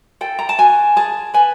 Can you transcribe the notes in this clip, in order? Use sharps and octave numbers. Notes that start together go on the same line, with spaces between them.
A4 G5
A#5
A5
F#4 G#5
G#4 A5
B4 G#5